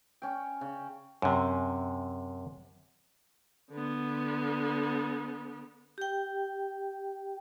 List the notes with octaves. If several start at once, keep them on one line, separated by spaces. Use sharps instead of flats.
C#4 G5
C#3
F#2 C3
D3 B3
G4 G5